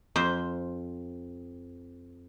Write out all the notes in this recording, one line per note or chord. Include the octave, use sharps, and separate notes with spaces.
F2 C5